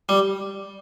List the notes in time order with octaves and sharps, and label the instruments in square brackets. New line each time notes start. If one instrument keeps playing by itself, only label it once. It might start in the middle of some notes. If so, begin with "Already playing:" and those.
[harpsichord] G3